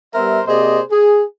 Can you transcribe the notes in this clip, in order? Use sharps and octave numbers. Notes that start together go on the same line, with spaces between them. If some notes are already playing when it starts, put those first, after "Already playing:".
G3 B3 A#4 C5 E5
C3 A#3 G#4 C5 D5 D#5
G#4